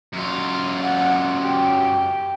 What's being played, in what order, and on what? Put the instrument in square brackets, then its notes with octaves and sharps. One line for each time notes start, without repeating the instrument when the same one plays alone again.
[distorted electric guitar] F#2 F4
[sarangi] F#5
G4